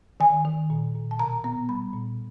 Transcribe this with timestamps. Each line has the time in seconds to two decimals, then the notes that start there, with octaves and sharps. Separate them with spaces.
0.20 D#3 G#5
0.45 D#3
0.70 A#2
0.95 A#2
1.11 A5
1.19 B2 A#5
1.44 B3 A#5
1.69 G3 B5
1.93 A#2